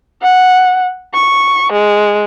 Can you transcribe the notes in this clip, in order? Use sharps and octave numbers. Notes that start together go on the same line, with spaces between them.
F#5
C#6
G#3